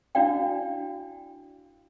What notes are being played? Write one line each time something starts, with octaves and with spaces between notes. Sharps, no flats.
D4 E4 F#4 D5 F5 G5